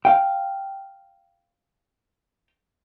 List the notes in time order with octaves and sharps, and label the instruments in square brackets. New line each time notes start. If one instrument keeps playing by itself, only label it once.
[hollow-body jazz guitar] F5 G5